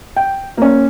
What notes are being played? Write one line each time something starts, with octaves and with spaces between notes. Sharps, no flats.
G5
A#3 C#4